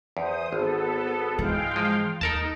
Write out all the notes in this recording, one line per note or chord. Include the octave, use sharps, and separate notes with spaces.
E2 C5 D#6
G#1 B3 A4
G#2 E3 G#3 F5 G5
F3
D#2 D#4 A4 A#4 A5